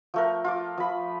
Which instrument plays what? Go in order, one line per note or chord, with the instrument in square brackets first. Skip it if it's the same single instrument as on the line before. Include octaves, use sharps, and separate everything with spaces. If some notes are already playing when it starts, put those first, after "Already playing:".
[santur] F3 A3 A#4
F4 D6
F3 B5